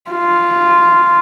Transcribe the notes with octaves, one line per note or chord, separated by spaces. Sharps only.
F4